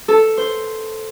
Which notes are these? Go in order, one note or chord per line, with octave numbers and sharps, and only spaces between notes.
A4
C5